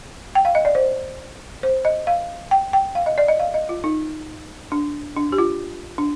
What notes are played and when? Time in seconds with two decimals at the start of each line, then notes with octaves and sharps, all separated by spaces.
0.35 G5
0.45 F5
0.55 D#5
0.65 D5
0.75 C5
1.63 C5
1.85 D#5
2.07 F5
2.51 G5
2.73 G5
2.95 F5
3.06 D#5
3.18 D5
3.28 D#5
3.40 F5
3.54 D#5
3.69 F4
3.84 D#4
4.72 D4
5.16 D4
5.32 G4
5.38 F4
5.98 D4